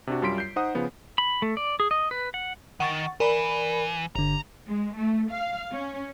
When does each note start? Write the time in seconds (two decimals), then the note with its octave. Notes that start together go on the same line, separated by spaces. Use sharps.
0.07 C3 D4 F#4
0.22 F#2 G3 F4 C6 B6 D7
0.38 G6 C7
0.56 D#4 C5 F#5 D#6
0.75 C#3 F3 B3
1.18 B5
1.42 A3
1.57 D5
1.80 G#4
1.91 D#5
2.11 B4
2.34 F#5
2.80 D#3 F#5 C#6 A6
3.20 E3 A#4 D5 B5
4.15 G1 D3 A#5
4.68 G#3
4.97 A3
5.31 F5
5.71 C#4